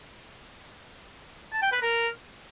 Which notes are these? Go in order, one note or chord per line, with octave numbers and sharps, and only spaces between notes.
A5
G5
B4
A#4